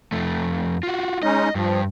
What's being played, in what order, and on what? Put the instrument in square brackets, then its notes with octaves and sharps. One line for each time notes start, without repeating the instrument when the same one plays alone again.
[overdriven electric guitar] F2 A3
F4 F#4
[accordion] G#3 C#4 D#4 [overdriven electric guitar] D#5
[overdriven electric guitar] G2 [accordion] F3